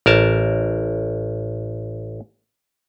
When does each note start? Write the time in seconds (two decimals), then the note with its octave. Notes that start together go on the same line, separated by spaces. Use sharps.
0.06 A1 A#4 A5